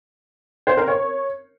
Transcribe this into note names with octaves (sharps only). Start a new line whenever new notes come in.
C5
A#4
C#5